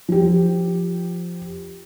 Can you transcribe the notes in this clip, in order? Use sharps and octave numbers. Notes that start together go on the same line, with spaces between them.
F3 G4